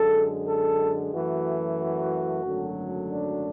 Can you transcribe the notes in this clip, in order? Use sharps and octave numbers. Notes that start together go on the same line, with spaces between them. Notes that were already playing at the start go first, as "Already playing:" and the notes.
Already playing: F#2 D3 G#3 A4
A4
F#2 E3 A3 F#4
F#4
G#1 F#2 D3 F#3 A3
D4